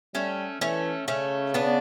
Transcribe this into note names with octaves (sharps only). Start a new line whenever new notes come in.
G3 A3 C#4
E3 A3 C#4
C#3 A3 C#4
B3 D4